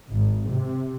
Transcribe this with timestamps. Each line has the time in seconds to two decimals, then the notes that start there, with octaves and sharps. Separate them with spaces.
0.11 G#1
0.50 C3